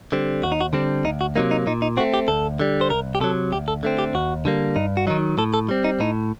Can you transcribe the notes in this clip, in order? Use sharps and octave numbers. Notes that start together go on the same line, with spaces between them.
D3 G3 C4
D#2 F#4
D#4
F#4
D3 G3 C4 D4
D2 D#4
F#4
C3 F#3 A#3 D#4
D#4
A#2 D#4
D#4
A3 C4 F#4
G4
D2 A4
D3 G3
C5
C2 A#4
G4
C3 F#3 A4
D2 G4
A4
D3 A3 C4
G4
D#2 F#4
D3 G3 A#3
G2 D#4
F#4
D#3 F#3 D#4
A2 A4
A4
G3 C4
D#4
A2 D#4